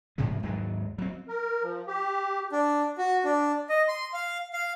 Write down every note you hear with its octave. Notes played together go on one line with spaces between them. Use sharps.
G#2 C3 F3 G#3
D#2 G#2 F#3 G#3
F#3 C4
A#4
F3
G4
D4
F#4
D4
D#5
C6
F5
F5